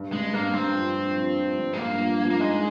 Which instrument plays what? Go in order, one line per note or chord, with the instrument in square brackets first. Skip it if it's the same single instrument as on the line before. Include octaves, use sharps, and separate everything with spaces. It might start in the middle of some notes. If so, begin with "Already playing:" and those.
Already playing: [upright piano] G2
[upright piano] G2 [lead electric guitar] G#3
[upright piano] G2 [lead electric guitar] A#3
[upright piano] G2 [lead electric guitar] C4
[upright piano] F3
F3
F3
F3
G2
[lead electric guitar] G#3
[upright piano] G2 [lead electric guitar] A#3
[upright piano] F3
F3
[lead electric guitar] A#3
[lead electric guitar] G#3 [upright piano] D#4